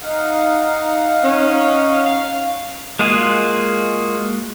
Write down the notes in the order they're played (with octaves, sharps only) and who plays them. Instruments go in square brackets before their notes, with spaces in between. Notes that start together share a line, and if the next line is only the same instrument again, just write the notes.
[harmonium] D#4 F5 F#5
[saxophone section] C#4
F5
[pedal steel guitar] G#3 A#3 F4 F#4 G#4